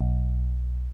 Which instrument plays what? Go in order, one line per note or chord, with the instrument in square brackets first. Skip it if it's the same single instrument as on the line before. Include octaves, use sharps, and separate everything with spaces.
[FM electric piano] B1